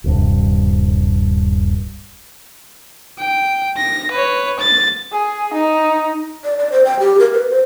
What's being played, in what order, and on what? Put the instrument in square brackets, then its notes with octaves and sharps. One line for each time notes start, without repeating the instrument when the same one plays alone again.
[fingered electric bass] D#1 C2 G2
[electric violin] G5
A#6
B4 C#5
A6
[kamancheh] G#4
D#4
[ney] D5
D5
C5
G5
G4
A#4
B4
C5